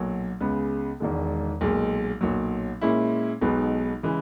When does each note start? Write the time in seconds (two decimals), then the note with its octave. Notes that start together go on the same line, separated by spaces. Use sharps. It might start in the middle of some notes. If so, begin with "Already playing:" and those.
Already playing: B1 A#2 F#3
0.40 C#2 C#3 G#3 B3
1.00 E1 E2 D#3 G#3
1.61 B1 A#2 G#3
2.21 B1 A#2 F#3
2.81 A#2 G#3 C#4 E4
3.41 B1 B2 G#3 B3 D#4
4.03 C#3 E3 G#3